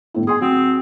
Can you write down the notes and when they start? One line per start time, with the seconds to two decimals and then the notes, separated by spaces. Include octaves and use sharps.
0.14 G1 A2 E4
0.27 G#4 G#5 C6 D#6
0.41 F#3 C4